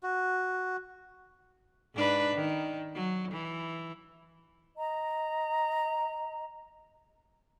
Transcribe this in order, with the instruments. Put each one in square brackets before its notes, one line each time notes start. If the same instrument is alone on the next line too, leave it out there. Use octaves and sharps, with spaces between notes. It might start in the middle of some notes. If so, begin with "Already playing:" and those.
[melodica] F#4
[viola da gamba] G#2 D4 B4
D#3
F#3
E3
[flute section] D#5 A#5